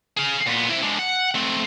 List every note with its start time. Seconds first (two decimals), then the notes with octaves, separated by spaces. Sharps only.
0.17 G#4 F5
0.46 A#2 B3
0.69 C3 E4
0.82 D3 G#3
0.99 F#5
1.35 A3 C4